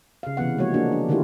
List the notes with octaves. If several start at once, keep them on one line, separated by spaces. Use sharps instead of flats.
C#3 F5
C3 E3 B3 F#5
F3 G#3 A#3 F#4 C#5
A#3 D4 F#4
D4
D3 D#3 A3 E4 F4 G4